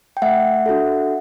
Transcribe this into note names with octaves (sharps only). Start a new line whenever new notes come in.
G5
A3 E5 F#5
D4 F#4 A4